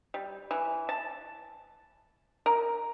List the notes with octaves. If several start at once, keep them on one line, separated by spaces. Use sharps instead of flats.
G3
E3
A5
A#4